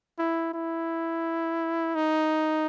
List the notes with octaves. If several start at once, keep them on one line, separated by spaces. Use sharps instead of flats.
E4
E4
D#4